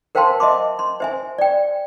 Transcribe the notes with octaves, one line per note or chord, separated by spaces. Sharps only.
A#4 C5 F5 G5 A5 C6
D#5 E5 A5 C6 D6
C6
C5 E5 G#5
D5 G5